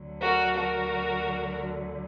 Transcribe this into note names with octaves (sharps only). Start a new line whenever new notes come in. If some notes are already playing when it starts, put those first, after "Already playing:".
Already playing: D2 D3 F#3
F#4 A#4
F#4 A#4